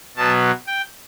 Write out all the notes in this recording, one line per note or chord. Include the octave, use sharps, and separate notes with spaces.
B2 F#3 B3 A5
G5